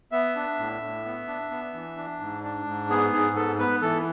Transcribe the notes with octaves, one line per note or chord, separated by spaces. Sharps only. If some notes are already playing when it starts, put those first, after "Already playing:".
B3 E5
D4
A2
A2
B3
D4
B3
E3
D4
G#2
D4
G#2
B3 G#4
G#2 G#4
B3 A4
B3 B4
E3 A4